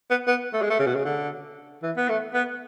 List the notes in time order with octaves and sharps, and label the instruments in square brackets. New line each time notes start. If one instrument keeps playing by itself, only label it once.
[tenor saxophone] B3
B3
A3
G#3
A3
C#3
B2
C#3
D3
E3
B3
A3
B3